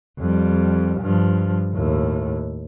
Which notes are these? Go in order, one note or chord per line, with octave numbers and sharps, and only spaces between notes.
F2 G3
G2 F3
D#2 A2